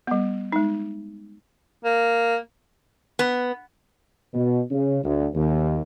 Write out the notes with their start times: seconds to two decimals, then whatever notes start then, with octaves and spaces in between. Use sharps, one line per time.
0.07 G3 B3
0.52 G#3 D#4
1.84 A#3
3.19 B3
4.34 B2
4.71 C#3
5.04 D2
5.34 D#2